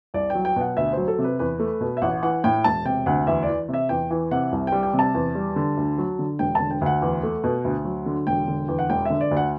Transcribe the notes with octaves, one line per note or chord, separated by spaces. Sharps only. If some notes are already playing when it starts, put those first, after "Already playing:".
C2 D5
F#3 G5
G5
B2 F#5
D2 E5
F#3 C5
A4
C3
B4
E2 B4
A3
B2
E5
A1 F#5
E3 F#5
A2 G5
E1 A5
C3 G5
D2 F#5
E2 E5
E3 D5
C3
E5
E2 G5
E3
C3 F#5
C2
G5
G3
G5
C3
A5
E2
G3
D3
D2
F#3
D3
E1 G5
D3 A5
G5
D2 F#5
E2
A3
B2
D2
F#3
D3
E1 G5
D3
E2
F#5
E1 G5
D3 E5
D5
D2
F#5